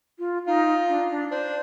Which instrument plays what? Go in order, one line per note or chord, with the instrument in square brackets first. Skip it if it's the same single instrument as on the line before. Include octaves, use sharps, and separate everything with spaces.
[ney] F4
[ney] D#4 [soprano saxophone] F4
[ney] D4
D4
[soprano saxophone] D4 [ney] C5